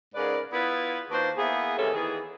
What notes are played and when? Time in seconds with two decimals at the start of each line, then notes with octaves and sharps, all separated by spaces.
0.15 G#2 C#3 A#4 B4 D5
0.53 B3 E4 F4 G#4 B4
1.10 D#2 D4 F4 F#4 B4 C5
1.37 A#3 B3 E4 G#4
1.78 A2 C3 D#3 E3 C#4 A4
1.93 D#3 E3 B3 G#4